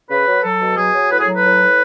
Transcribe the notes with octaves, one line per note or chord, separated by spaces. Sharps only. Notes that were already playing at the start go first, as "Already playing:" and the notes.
C#3 B4
F#3
F#3 A4
B2
F#3 G#4
F#3
A2 B4
G#4
F#3
B4
A2
A2